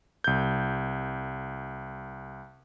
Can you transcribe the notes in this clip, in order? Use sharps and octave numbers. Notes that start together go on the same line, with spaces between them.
C2 G6